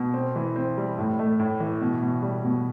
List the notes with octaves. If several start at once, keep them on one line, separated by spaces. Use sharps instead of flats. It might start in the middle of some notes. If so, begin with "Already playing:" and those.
Already playing: B2
C4
E3
C4
G3
A2
A3
A2
E3
B2
B2
G3
B2